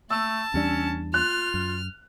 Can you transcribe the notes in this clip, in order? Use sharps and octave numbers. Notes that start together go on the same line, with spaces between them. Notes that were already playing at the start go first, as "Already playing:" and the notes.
A3 A5 E6
E2 G3 C#4 D4
F4 F6 F#6
F#2